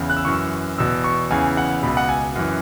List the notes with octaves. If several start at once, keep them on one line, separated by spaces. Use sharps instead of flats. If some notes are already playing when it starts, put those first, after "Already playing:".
Already playing: E2 C#3
F#6
E6
F#2 E3 C#6
E6
E2 B2 E6
C#6
E2 C#3 E3 G#5
F#5
C#2 B2 B5
F#5
G#5
F#2 E3